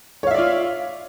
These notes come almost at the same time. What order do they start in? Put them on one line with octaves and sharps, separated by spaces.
C#5 F5 E5 D5 F4